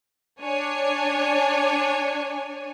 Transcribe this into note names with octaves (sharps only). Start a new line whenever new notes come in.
D4 C#5 G#5